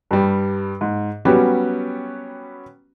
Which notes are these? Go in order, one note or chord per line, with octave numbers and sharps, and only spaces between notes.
G2 G3
G#2
F#3 G3 B3 C#4 F#4 G4